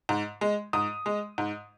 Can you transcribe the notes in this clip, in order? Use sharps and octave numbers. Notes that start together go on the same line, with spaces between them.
G#2
G#3
G#2 D#6
G#3
G#2